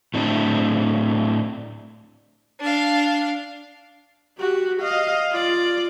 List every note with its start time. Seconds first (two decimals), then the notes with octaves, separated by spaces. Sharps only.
0.14 A2 C4 D4
2.60 D4 F5
4.38 F#4 G4
4.80 D#5 F5
5.32 F4 D5